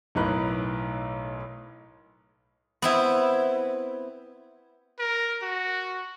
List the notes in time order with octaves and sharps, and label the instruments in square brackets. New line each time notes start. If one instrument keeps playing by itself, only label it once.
[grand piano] B1 A2 D#4 A#4 B4 F#6
[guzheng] B3 C4 E4
[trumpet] A#4
F#4